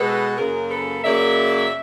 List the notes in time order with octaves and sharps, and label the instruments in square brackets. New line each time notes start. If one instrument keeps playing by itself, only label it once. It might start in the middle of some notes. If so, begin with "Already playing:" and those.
Already playing: [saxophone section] B2 G#3 B3 A4 B4
F#2 C#3 F#3 A#3 G#4 A#4
A4 B4
F#2 C#3 F#3 A#3 D5 E5